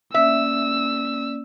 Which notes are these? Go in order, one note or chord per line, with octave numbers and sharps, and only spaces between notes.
A#3 C#4 D5 E5 E6